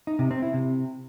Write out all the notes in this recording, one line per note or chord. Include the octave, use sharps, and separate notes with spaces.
D#4
C3
C4
E4
C3